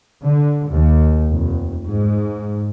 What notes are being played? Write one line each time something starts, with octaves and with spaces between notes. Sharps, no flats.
D3
D#2
F1
G#2